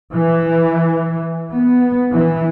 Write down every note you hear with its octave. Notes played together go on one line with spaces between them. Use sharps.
E3
B3
E3